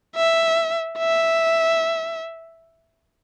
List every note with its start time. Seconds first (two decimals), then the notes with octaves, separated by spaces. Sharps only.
0.16 E5
0.99 E5